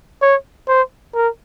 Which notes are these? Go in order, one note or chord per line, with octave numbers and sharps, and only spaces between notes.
C#5
C5
A#4